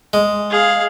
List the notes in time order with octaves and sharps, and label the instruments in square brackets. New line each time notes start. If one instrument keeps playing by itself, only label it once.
[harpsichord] G#3
[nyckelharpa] G#4 F5